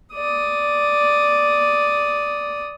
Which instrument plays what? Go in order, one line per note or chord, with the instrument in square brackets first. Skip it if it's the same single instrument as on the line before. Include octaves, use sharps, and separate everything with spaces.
[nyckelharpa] D5 D#6